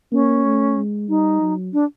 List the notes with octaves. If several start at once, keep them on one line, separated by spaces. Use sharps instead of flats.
A#3 C#4
A3
G#3
G3 D#4
F#3
D4